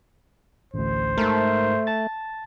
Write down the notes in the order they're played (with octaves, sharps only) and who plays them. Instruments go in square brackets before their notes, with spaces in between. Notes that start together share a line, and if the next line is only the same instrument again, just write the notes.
[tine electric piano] A1 D2 [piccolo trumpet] C5
[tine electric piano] G#2 A4 A#4 [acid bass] A3
[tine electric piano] A5 A6